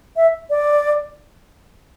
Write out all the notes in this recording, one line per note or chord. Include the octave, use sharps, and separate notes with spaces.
E5
D5